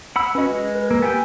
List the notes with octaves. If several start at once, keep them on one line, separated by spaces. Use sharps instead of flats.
F#5 B5 E6
C#4 F#4 B4 D#5
G#3
A#4 B4
A#3 E6
B3 G4 G5 G#5 E6